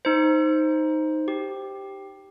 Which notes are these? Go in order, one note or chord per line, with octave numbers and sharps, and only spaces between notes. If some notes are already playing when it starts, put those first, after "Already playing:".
D#4 C5
G4